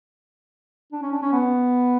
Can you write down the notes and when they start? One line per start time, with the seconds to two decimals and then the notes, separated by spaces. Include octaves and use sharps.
0.92 D4
1.02 C#4
1.12 D4
1.22 C#4
1.33 B3